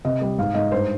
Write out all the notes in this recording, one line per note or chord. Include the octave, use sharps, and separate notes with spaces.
C3 D#5
G3
G#2 F5
G#2 D#5
G2 C5